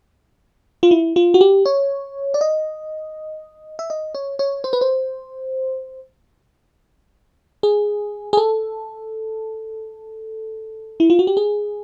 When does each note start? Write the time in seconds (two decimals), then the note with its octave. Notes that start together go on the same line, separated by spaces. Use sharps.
0.83 F4
0.91 E4
1.16 F4
1.34 F#4
1.41 G4
1.66 C#5
2.34 D5
2.41 D#5
3.79 E5
3.90 D#5
4.15 C#5
4.39 C#5
4.64 C5
4.73 B4
4.81 C5
7.63 G#4
8.33 G#4
8.37 A4
11.00 E4
11.10 F4
11.19 F#4
11.27 G4
11.37 G#4